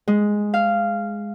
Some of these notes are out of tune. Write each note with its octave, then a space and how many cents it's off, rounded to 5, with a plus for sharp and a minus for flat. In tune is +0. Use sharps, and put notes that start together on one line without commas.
G#3 +0
F5 -10